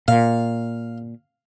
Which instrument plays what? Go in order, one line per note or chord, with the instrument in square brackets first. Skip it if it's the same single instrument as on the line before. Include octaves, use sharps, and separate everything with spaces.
[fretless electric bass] A#2 [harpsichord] F5